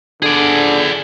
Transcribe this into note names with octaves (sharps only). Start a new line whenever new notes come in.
D3 G#4 D5